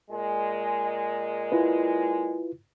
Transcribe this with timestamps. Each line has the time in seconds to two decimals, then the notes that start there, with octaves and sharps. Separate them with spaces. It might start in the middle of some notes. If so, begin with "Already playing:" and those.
0.11 A#2 G#3
1.52 E4 F4 B4